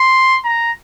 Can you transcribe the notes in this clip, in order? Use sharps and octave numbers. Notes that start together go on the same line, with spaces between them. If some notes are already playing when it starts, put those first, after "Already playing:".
Already playing: C6
A#5